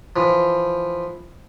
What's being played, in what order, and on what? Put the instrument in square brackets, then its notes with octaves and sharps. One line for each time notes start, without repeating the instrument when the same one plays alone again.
[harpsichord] E3 F3